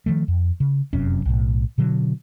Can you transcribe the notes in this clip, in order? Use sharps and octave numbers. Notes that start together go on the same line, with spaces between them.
D#3 F3 A3
F2
C#3
F1 F#2 C3 C#4
B1 A2
B2 D3 F#3